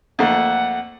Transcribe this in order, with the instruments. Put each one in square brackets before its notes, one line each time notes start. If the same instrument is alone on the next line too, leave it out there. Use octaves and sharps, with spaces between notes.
[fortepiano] F2 A3 A#3 [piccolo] F#5